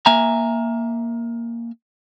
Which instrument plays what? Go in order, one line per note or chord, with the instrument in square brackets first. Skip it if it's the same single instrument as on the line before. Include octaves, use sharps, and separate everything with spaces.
[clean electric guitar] A#3 E5 G#5 A#5